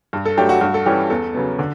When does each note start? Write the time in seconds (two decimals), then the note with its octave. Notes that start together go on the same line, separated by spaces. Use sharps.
0.13 G2
0.25 A4
0.37 F#3 A3 D4 G4
0.49 F#4
0.61 G2 F#4
0.74 A4
0.86 E3 G3 C#4 G4
1.10 E2 A4
1.35 C#3 F#3 B3
1.59 D3